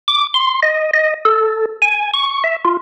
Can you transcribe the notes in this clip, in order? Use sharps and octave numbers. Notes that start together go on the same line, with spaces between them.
D6
C6
D#5
D#5
A4
G#5
C#6
E5
F4